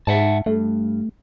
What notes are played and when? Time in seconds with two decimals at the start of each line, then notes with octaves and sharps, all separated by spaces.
0.07 G#2 E5 F#5 A5
0.46 G2 A3